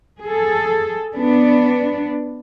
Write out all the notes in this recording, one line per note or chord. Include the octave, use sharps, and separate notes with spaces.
G#4 A4
B3 D4